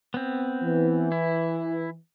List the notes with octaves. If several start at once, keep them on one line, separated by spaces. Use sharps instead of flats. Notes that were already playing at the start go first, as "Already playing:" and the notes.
B3 C4
E3
E4